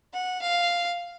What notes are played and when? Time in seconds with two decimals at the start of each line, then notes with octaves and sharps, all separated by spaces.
0.13 F#5
0.42 F5